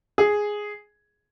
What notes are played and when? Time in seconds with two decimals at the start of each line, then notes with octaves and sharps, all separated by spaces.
0.18 G#4